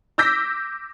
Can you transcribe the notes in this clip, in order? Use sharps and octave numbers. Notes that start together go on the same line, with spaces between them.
D6 E6 G6 A#6 B6